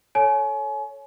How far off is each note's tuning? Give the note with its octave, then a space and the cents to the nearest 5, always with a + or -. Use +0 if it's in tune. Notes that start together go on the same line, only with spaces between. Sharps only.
A4 +0 C#5 +0 G#5 +35